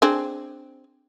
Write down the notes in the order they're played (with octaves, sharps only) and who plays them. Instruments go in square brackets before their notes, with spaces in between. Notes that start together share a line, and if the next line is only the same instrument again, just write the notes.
[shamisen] C4 D4 G#4